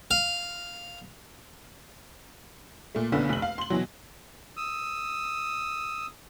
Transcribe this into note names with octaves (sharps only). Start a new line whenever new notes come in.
F5
A#2 A3
F#1 B1 D3 B3 C#4
F1 F#7
F5
C6 F#7
B2 E3 F#3
D#6 E6